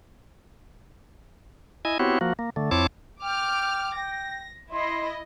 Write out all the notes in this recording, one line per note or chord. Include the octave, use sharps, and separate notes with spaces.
E4 D#5 G#5
B3 C4 E4 F#4 G4 C#5
F3 A#3 F#4
A#3
D3 A3
F2 C4 E4 C#5 A5 D6
G5 D6 F6
G5 A#6
E4 D#5 C6